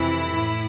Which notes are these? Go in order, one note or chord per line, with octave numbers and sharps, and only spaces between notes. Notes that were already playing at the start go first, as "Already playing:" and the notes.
Already playing: F2 C3 E3 E4
A2